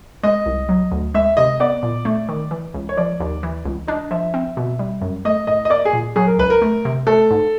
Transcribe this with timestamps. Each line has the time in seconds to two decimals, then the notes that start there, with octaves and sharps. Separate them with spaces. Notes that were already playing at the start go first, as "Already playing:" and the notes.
0.23 G#3 D#5
0.46 C2
0.69 F#3
0.91 D2
1.15 G#3 E5
1.37 C3 D#5
1.60 B3 D5
1.83 A#2
2.05 A3
2.29 D#3
2.51 E3
2.74 C#2
2.89 C#5
2.97 F3 D5
3.20 D#2
3.43 E3
3.65 C#2
3.87 D4 D#5
4.11 F3 E5
4.34 C4
4.57 B2
4.79 G3
5.01 F#2
5.25 A3 D#5
5.47 A2 D#5
5.65 D#5
5.70 A#3 D5
5.85 G#4
5.93 A#2
6.16 F#3 G#4
6.27 A#4
6.39 C#2 B4
6.50 A#4
6.62 A3
6.85 C3
7.07 A3 A4
7.31 G#2